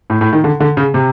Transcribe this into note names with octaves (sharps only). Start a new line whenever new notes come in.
A2
A2
D#3
D3
D3
C#3
C3